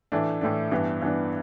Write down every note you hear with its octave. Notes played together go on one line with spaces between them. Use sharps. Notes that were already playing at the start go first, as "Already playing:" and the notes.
A2 E3 A3 D4
A2 E3 A3 D4
G2 E3 B3 D4
G2 E3 B3 D4